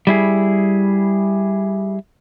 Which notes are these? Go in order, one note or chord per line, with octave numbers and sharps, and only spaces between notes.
G3 E4 G#4